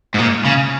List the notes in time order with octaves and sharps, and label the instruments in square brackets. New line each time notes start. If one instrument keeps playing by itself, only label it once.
[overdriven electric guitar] G#2
A#2
C#3